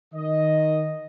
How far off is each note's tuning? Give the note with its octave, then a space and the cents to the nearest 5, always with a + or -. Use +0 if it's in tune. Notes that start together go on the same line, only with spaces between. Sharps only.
D#3 +0 D#5 +0